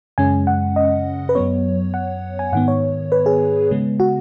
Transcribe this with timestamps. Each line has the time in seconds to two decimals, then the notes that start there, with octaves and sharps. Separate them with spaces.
0.18 F#2 C#3 G#3 C#4 G#5
0.47 F#5
0.76 D#5
1.29 B4
1.35 F#2 F#3 B3 C#5
1.94 F#5
2.39 G#5
2.52 G#2 D#3 B3 F#5
2.68 C#5
3.12 B4
3.26 G#4
3.71 C#3 G#3 B3
4.00 F#4